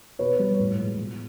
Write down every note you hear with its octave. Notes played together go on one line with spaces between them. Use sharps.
B2 B4 C#5
G3
A2
F3 G#3
B2